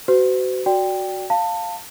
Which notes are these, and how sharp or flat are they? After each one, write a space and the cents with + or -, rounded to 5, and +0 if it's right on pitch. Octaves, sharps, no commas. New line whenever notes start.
F#4 +25 C5 -45
F#4 +0 D5 -10 G5 +0
F5 +0 A5 +25